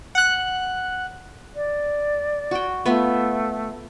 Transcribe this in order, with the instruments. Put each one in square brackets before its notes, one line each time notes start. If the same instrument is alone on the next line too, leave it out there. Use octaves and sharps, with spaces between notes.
[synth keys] F#5 F#6
[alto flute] D5
[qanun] F#4 G5
[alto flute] A3 [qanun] B3 F4 E5